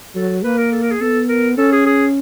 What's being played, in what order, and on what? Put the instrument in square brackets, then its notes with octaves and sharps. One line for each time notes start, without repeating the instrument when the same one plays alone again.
[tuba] F#3 [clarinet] A4
[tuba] A#3 [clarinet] B4
[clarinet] A#4
A4
A#4
G#4
[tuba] B3 [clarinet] A4
[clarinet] A#4
[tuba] C#4 [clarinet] A4
[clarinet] G#4
G#4